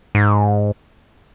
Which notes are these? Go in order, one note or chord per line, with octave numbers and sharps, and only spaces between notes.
G#2